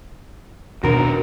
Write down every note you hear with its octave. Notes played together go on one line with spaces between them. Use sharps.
D#2 B2 D4 F#4 A#4